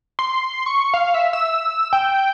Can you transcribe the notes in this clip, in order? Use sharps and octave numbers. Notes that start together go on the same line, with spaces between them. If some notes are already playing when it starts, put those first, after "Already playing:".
C6
C#6
F5
E5
E6
G5